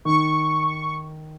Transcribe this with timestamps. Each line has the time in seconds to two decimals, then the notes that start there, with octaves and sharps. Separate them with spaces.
0.05 D#3 C#6